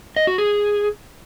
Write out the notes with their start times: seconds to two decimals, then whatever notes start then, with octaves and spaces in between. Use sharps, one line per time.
0.16 D#5
0.27 F#4
0.38 G#4